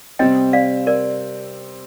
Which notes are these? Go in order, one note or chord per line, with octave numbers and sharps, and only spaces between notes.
C3 G3 C4 D#5 G5
D5 F5
A#4 D5